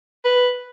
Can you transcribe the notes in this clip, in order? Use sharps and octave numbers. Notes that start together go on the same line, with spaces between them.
B4